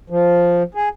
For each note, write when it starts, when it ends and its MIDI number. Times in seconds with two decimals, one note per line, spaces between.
0.10 0.63 53
0.75 0.89 68